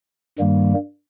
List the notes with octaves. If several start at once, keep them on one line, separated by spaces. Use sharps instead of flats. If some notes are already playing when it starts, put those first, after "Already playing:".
G2 D#3 G3 A#3